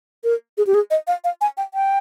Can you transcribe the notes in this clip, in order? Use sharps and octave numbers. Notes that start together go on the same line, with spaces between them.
A#4
G#4
G4
G#4
D#5
F5
F5
G#5
G5
G5